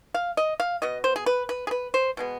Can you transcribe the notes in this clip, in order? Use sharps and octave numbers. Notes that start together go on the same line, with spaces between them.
F5
D#5
F5
B2 B3 D#5
C5
G#4
B4
B4
G#4
B4
C5
B2 G#3 B3